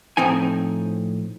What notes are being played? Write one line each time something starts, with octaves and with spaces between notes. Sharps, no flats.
A2 F3 C4 D#4 G#5